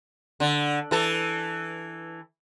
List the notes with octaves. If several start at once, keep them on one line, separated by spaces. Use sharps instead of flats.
D3
E3 A4